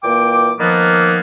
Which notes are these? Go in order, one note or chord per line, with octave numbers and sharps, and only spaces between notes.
A#2 E3 A#3 G5 D6
D#3 F3 A#3 B3